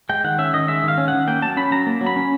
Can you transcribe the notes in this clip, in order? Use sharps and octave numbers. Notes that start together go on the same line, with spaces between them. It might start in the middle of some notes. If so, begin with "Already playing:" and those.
G#3 G5
D#3 F#5
C#4 E5
D#3 D#5
G#3 E5
D#3 F5
C#4
D#3 F#5
A#3 G5
F#3 A5
C#4 B5
F#3 A#5
A#3
F#3
B5
C#4